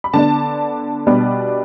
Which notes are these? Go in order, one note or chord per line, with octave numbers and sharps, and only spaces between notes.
B5
D3 B3 D4 A5
B2 G3 B3 D4